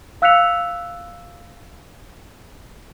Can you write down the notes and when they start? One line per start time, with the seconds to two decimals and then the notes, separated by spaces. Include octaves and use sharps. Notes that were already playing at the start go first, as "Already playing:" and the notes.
0.22 F5 E6 F#6 B6 C#7 F7